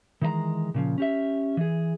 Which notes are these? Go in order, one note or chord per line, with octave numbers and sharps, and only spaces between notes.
D#3 E3 G#3 D#5 A#5
A#2 C#3 F3
C#4 G4 E5
E3 G#4